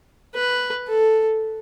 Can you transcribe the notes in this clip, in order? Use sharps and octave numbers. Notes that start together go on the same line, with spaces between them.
B4
A4